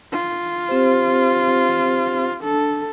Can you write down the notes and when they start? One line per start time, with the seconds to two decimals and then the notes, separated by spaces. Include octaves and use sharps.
0.12 F4
0.69 C4 G4 C5
2.44 D4 A4